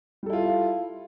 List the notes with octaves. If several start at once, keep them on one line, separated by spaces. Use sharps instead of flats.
G3 E4 F4 A4